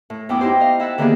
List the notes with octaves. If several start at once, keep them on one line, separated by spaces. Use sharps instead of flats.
A2
F#2 B3 E4 G5 D6 D#6
D#4 E4 G4 C5
D#5 F5
E4 E5 F#5 A5
D3 D#3 A#3 B3 G4 G#4